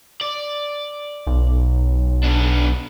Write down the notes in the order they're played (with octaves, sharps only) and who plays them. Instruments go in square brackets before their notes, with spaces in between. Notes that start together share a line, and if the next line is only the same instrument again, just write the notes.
[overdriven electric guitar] D5
[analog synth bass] B1
[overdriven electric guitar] B3 D4